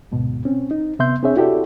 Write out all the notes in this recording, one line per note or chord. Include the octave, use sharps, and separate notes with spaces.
D2 G#2 B2
C4 C#4
D#4
C3 B3 E5 C6 G6
C4 D4 G#4 C#5 E5
E4 F#4 G4 A4 D5 E5